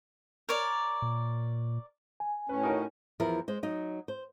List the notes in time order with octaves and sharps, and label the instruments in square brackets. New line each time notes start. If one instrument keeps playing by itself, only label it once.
[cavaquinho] A#4 C#5 D5
[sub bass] A#2
[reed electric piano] G#5
[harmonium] A2 C#4 [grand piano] B4 C#5
[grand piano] D#4 F#4 A#4
[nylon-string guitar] E2 F3 E4 A#4
G#3 C5
F#3 D#4
C5